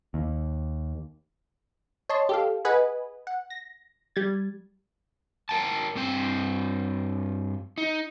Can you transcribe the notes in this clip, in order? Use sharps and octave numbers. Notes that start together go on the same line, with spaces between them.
D#2
C#5 D#5 A5 C6
G4 A4 F5
G#4 B4 D#5 F#5 G#5 B5
F#5
A#6
G3 G#6 A6
A#4 G5 A5
G2 C4 G5
D#4